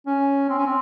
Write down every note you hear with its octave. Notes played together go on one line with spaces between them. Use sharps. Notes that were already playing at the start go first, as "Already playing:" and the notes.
C#4
C4
C#4
C4